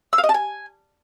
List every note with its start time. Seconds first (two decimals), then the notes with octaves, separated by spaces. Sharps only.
0.13 E6
0.18 F5
0.24 D#5
0.29 A5
0.34 G#5